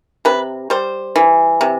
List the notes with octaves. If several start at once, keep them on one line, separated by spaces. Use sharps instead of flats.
C3 B4
G3 C5
E3
C3